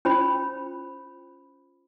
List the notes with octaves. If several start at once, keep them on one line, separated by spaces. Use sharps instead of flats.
C#4 F4 C5 B5